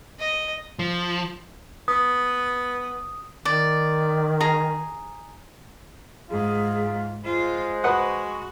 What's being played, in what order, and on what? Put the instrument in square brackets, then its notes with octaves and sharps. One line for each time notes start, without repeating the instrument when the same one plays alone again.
[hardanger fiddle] D#5
[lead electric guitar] F3
[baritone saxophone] B3 [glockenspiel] D#6
[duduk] D#3 [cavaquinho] D5
[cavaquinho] G#4 A#5
[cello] G#2 [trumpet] F4 [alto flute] G#4
[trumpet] G#3 [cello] F4 [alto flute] C5
[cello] F#4 [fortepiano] B4 D#5 F#5